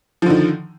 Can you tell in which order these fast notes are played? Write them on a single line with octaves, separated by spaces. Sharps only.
F3 D3 D#3